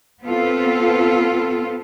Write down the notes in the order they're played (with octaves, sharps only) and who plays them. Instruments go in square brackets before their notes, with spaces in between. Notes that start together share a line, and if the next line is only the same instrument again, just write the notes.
[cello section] B3 C4 F4 A4